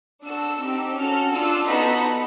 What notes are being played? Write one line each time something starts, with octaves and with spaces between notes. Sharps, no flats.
D4 F#4 A4 E6
C4 D#4 G4
C#4 F#4 A4 F6
D4 F4 A4 E6
B3 D#4 F#4 A4 B5